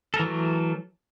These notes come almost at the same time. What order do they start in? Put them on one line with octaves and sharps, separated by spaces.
A4 A#4 E3 A3 F#3